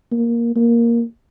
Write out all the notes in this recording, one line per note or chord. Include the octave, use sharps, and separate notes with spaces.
A#3
A#3